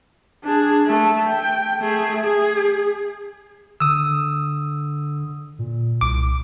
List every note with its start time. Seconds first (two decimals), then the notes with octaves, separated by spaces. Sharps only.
0.44 D4 G#4
0.87 A3 A4
1.27 G5
1.80 A3 G#4
2.25 G#4
3.80 D3 D#6 E6
5.59 A#2
6.01 C2 D6